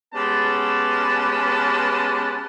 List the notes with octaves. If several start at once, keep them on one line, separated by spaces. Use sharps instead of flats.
G#3 B3 C#4 G4 B4 A5